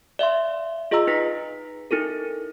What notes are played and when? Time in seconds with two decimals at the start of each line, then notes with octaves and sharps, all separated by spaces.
0.19 D5 E5 F5 C6
0.91 F4 G#4 D#5 F5 A#5 E6
1.07 D#4 B4 A#6 B6
1.91 D#4 E4 A4 A#4